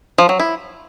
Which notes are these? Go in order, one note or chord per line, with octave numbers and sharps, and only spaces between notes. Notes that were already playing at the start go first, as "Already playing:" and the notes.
F3
F#3
E4